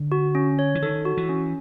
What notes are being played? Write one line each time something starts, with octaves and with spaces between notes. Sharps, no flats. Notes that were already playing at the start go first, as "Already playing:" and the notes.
Already playing: D3
F#4
C#4
C#5
E3
D#3 A4
F#4
E3
C#4